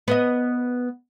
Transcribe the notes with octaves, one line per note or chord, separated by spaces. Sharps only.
B3 B4 D#5